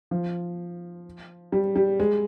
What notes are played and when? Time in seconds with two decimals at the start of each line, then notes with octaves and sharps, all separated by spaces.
0.11 F3
1.52 G3
1.76 G3
2.00 G#3